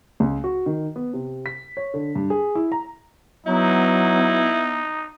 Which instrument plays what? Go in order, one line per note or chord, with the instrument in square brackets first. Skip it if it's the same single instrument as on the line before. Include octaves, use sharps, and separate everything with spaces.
[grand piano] C#2
F#4
D#3
B3
C3
B6
C#5
D3
G2
G#4
E4
A#5
[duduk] F#3 [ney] B3 [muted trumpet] D#4 [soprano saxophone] E4